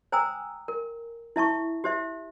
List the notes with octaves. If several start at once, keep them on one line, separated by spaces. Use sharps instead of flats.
C5 G5 G#5 A#5 D#6 E6
A#4
E4 E5 A5 C#6
G4 C5 E5